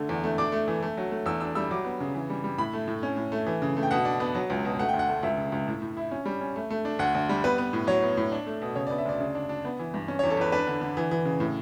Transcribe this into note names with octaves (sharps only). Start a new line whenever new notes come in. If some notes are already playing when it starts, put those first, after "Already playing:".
Already playing: D3 A3
E2
A3
D4 D6
A3
E3
A3
F#3
A3
E2 E6
D4 E6
G3 E6
F#3 D6
B3
C#3
E3
G3
G3
A2 B5
A3
A2
C#4
A2
A3
E3
C#3
A3
G5
B2 F#5
D4
B3
F#3
C#2
B2
A3 F#5
D2 G5
F#5
A3
C#2 E5
C#3
C#2
A2
A2
E4
C#4
G3
C#4
A3
A3
D4
D2 F#5
D2
G3
B3 B4
B3
A2
F#3 C#5
B3
A2
D4
A3
B2
C#3 C#5
D5
B3
E5
D2 D5
C#3
D4
D4
B3
E3
G2
C#4
C#5
E2
A4
E2 B4
D4 B4
D3
D3
E3
E3
C#3
A2